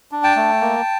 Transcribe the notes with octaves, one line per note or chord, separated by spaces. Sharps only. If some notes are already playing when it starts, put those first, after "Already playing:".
D4
G5 A5
A3
A#3